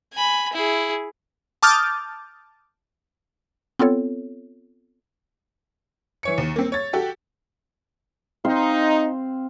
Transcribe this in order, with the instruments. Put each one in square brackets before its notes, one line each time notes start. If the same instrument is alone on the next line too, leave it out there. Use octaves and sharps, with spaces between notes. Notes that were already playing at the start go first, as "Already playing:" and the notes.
[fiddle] G#5 B5
E4 G#4
[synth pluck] A5 D6 D#6 F6 G6 A6
B3 C4 F4 A4 C#5
[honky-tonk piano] E3 C#5 C#7
D#2
A#3 C4
C#5 A6
F#4 G4 A4
[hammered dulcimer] C4 F5 C6 [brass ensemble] D#4